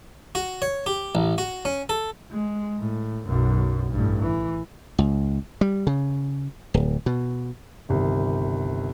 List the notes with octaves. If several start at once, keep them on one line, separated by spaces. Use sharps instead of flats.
F#4
C#5
G4
A1
F#4
C#4
A4
G#3
A2
B1 F#2
A1 G2
E3
C#2
G3
C#3
D1
B2
G1 C2 D#3